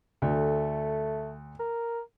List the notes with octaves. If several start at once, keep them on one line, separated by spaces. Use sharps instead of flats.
D2 A3
A#4